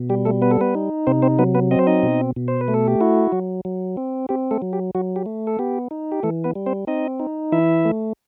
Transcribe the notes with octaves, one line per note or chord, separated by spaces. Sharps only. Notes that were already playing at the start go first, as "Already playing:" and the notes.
Already playing: B2
G3 G4
A3 A4
B3 B4
A4
B3 B4
D#4
C3 C4 C5
C4 C5
F#3 B3 B4
B3 B4
C4 D#5
C5
D#4 D#5
B2
B2
C5
B4
A3
A4
G4
E4 F#4
F#3
F#3
C4
C4 G4
A3 A4
F#3
G4
F#3 F#4
G4
A3
A4
B3 G4
D#4
G4
E3 A3 A4
B3 B4
G3
C4 C5
C4 D#4 D#5
D#4
E3 E4 E5
A3